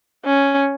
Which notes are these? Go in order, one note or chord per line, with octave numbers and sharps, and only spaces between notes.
C#4